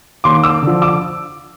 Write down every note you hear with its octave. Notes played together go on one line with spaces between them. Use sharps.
D#2 C6 D6
D6 E6
D3 F3
D6 E6